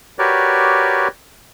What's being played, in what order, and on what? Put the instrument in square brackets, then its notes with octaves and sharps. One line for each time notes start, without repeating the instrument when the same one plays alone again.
[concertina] F#4 G4 A#4 B4 C#5 D5